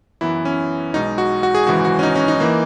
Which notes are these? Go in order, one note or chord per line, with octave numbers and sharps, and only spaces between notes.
F#2 E3 B3 E4
C#4
B1 B2 G#3 D#4
F#4
F#4
G#4
G#1 F#2 C#3 E3 G#3 F#4
F#4
C#4
D#4
C#4
D#4
E3 A#3